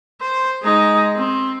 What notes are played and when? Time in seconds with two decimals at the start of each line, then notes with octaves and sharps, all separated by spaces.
0.21 C5
0.62 G#3 D#4
1.16 C4